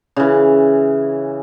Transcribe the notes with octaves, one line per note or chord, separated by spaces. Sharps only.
C#3 E3